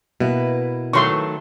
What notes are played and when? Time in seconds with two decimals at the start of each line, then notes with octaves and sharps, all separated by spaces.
0.20 B2 A#3 E4 B4
0.93 D#3 F#3 A3 C6 C#6